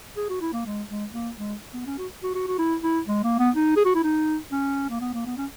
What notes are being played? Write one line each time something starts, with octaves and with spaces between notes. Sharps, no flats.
G#4
F#4
E4
A#3
G#3
G#3
A#3
G#3
B3
C#4
F#4
F#4
F#4
F#4
E4
E4
G#3
A#3
B3
D#4
G#4
F#4
E4
D#4
C#4
A#3
B3
A#3
B3
C#4